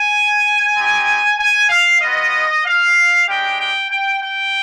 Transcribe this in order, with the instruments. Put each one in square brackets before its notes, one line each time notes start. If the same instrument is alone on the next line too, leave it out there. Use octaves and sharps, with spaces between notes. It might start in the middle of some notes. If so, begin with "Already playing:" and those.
Already playing: [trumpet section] G#5
C4 D#4 G4
G#5
F5
B3 F4 D#5
F5
G#3 D4 G4 G5
G5
G5
G5